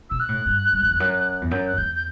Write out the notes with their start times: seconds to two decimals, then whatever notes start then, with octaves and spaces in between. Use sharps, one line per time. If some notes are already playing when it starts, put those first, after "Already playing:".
0.10 B2 E6
0.20 F#6
0.29 A2
0.46 G2
0.73 G2
0.82 F#2
0.91 E2
1.00 F#2
1.41 E2
1.51 F#2 G6
1.68 F#6
1.78 E2 G6
1.95 G6